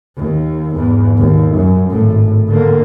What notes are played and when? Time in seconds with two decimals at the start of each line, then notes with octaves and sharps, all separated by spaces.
0.17 D#2
0.74 E2 G#2
1.18 D#2
1.56 F#2
1.90 G#1 A2
2.48 D3 A#3